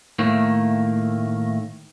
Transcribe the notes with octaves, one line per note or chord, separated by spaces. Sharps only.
A2 D#3 A3 A#3